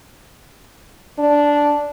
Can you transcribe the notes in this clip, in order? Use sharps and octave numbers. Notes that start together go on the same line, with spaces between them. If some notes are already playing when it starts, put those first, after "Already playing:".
D4